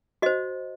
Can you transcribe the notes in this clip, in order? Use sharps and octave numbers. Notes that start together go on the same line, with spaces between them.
F#4 C5 D#5